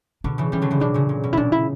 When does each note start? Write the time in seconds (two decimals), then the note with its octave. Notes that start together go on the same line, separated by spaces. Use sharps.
0.24 B2 D3 D4
0.38 C#3 E3
0.52 E3 G3 C#4
0.62 D3 F#3
0.71 C#3 E3
0.80 B2 D3 D4
0.94 A#2 C#3
1.09 A#2
1.24 B2
1.33 E4
1.37 A#2 C#3 D4
1.52 E4